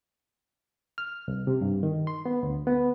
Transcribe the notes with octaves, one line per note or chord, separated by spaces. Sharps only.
F6
C2
C3
G2
D#3
C6
B3
D2
B3